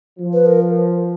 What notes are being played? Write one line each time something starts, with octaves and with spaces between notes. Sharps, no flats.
F3
B4
A#4